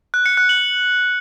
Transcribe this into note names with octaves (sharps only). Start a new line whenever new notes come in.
F#6
C#7
F#6
F#7